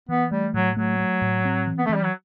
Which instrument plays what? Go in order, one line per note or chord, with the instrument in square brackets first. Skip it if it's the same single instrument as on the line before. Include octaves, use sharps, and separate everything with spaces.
[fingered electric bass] E3 [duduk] B3
[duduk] G3 [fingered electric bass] A3
[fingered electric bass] A2 [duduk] F#3
[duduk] F#3 [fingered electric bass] A3
[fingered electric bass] A3
A2
C4
E3
[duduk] B3
[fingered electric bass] E3 [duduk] A3
[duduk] G3
F#3